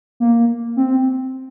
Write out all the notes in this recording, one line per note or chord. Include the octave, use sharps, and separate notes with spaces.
A#3
C4